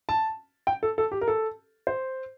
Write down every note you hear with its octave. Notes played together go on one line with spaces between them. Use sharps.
A5
G5
A4
A4
G4
A#4
A4
C5